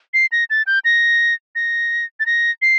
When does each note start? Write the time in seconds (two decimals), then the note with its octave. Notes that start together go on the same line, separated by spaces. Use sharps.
0.14 C7
0.32 A#6
0.50 A6
0.67 G6
0.85 A#6
1.55 A#6
2.20 A6
2.26 A#6
2.62 C7